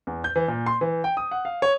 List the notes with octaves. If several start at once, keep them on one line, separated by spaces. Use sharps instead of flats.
E2
G6
E3
A#2
C6
E3
G5
D#6
F#5
F5
C#5